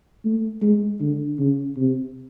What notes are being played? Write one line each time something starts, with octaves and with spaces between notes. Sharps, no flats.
A3
G#3
D3
C#3
C3